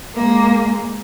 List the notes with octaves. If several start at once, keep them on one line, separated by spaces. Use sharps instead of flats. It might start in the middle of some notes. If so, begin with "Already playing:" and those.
G#3 A#3